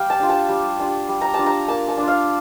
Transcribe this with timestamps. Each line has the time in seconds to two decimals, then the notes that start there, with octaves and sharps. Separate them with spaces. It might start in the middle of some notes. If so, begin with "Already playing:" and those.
Already playing: G3 F5 G5
0.10 A5
0.19 D4 F4
0.29 A5
0.49 G3
0.80 D4 F4
1.09 G3
1.21 A#5
1.34 A5
1.39 D4 F4
1.46 A#5
1.68 A#3 A5
1.88 A5
1.98 D4 F4
2.08 F5